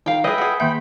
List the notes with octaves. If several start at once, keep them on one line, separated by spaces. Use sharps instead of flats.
D#3 F5 G5
G#4 B4 D#5 E5 G5
G#4 F#5
D#3 A#3 E5 G5 B5